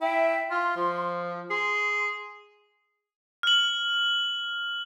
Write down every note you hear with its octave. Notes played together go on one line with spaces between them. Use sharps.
E4 E5 G5
F4 C6
F3
G#4 C6
F6 F#7